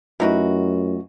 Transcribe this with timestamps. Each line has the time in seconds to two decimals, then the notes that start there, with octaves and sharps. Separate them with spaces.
0.20 F#2 E3 A3 D#4 F4 F#4